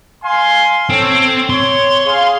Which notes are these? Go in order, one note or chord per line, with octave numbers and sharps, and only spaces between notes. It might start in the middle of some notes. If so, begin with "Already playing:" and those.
F5 G#5 C6
C4 A4 C#5
C#5 C6
G#4 F5